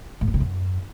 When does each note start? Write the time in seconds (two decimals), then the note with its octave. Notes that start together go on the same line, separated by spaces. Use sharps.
0.21 A2
0.28 G#2
0.34 C#3
0.40 F#2